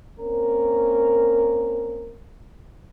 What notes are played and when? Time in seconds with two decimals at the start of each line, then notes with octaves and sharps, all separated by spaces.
0.20 A#3 C4 C#4 A#4